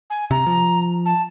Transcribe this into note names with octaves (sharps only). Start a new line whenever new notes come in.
G#5
C3 A#5
F3
A5